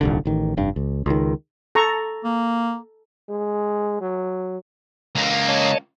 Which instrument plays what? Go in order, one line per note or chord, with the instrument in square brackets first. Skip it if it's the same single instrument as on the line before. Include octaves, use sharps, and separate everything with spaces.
[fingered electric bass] D#1 C2 D3
A1 D#3
F1 G2
C#2
C#2 D#3
[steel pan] A4 A#5 C#6
[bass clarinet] A#3
[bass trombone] G#3
F#3
[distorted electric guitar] C#2 A#3 [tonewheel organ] A#5
[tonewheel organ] C#5 D#5 A5